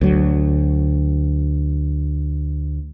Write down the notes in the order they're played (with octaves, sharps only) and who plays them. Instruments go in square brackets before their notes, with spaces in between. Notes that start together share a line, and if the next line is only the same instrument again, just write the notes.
[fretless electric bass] D2 F#3